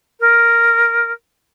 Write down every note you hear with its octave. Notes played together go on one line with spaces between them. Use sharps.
A#4